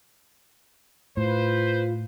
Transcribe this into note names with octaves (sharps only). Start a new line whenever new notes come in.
A2 F4 B4 C5